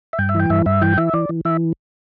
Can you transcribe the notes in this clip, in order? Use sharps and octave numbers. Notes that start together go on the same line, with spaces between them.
E5
G2 G5
E5
E3 G5
G2 E5
G2 E5
E3 G5
E3 E5
E3 D5
E3
E3 E5